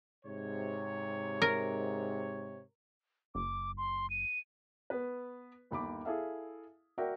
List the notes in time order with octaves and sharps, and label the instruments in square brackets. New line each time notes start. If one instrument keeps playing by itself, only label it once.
[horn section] G#2 C3 C#5
[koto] A#4
[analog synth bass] F#1 [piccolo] D6
[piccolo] C6
D#7
[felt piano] B3 B4
G1 D#2 B5 D6
E4 G#4 A4 E5 F5
F#4 A#4 D5 E5 G5